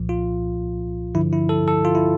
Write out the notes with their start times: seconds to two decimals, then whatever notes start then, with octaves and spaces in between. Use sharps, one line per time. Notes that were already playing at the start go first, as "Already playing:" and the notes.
Already playing: C2 A#2 F3
0.09 F4
1.15 G2 D3 F3 E4
1.33 E4
1.49 A4
1.68 A4
1.85 F4
1.95 E4